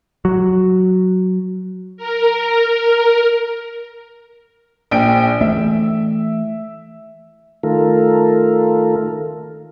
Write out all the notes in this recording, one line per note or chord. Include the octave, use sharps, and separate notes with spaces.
F#3
A#4
A#1 G5 D7
E3 A3 E5
D#3 A3 F4 A4 A#4